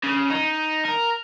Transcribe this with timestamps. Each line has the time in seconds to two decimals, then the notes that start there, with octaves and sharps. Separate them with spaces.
0.03 C#3
0.30 D#4
0.85 A#4